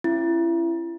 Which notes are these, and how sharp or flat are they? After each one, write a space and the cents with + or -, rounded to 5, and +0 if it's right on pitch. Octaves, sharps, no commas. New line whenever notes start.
C#4 -25 E4 +30